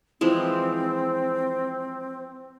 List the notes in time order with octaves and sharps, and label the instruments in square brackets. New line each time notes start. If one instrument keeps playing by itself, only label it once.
[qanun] E3 F3 G#3 [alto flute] C4